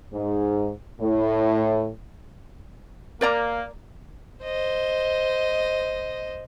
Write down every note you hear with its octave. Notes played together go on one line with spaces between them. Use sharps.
G#2
A2
A#3 A#4 D5 A#5
C5 D#5